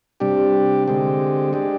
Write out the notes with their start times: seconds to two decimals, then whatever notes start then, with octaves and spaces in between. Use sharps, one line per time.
0.20 C3 G3 D4 G4
0.88 D3 G#3 C4 G4
1.53 G#3 D4 G4